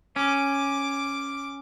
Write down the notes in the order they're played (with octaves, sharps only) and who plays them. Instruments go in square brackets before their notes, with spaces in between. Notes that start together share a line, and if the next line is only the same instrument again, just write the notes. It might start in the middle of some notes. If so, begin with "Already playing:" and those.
[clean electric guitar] C#4 [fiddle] D6